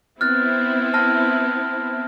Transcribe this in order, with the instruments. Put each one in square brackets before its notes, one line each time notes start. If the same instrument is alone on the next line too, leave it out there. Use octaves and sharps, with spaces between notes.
[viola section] B3 C4 E4 [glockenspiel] F6 F#6 A6
[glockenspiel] A5 F6 A#6